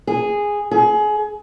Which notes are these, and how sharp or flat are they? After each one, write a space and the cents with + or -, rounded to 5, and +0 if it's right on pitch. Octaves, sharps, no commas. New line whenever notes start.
G#4 -10
G#4 +25